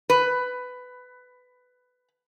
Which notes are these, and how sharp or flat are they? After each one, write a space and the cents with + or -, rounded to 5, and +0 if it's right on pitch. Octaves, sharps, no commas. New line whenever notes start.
B4 +15